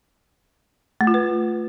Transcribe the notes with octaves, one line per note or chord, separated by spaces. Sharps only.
A3
F4
B4